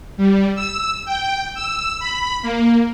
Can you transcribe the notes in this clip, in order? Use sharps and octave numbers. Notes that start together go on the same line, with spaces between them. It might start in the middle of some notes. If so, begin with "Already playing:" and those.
G3
E6
G5
E6
B5
A#3